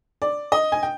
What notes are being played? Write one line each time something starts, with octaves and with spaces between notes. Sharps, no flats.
D5
D#5
G#5
G5